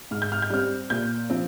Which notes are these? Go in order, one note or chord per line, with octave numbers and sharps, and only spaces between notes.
G#2 F6
G6
F6
G6
G3 C4 F6
A#2 G6
F3 C4